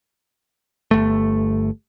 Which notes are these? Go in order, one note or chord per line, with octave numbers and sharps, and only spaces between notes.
G1 A3